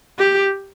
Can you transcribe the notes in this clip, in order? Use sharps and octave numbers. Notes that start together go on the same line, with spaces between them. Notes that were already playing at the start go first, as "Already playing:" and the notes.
G4